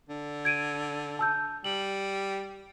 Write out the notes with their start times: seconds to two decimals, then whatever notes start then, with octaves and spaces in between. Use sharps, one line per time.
0.09 D3
0.45 G#6 D7 D#7
1.19 A5 E6 G6
1.64 G3 F#7